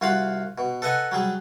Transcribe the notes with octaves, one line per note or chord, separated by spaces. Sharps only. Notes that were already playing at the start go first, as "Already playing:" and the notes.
C2 F4 F#4 F5 B5
B2
A4 B4 D#5 F#5 G#5
F#3 G3 G#4